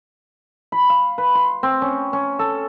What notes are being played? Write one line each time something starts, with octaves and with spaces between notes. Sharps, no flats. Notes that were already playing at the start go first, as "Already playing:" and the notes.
B5
F5
B4
C6
C4
C#4
C#4
A4